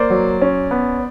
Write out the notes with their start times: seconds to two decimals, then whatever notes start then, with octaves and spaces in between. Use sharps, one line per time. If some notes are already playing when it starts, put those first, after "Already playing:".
Already playing: A#3 C5 D5
0.10 F#3
0.42 C#4
0.71 B3